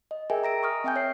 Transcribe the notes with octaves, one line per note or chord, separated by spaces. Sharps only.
D#5
G#4 A#4 D#5 E5 G5 G#5
A#5 A#6 D7
C#6 D#6 F6
C4 E5 G5 G#5 G6
C#5 C7